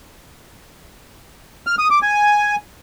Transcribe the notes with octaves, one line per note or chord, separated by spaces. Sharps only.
F6
D#6
D6
G#5